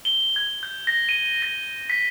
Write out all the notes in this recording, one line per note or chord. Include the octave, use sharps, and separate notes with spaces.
G7
G#6
G6
A#6
D#7
A#6
B6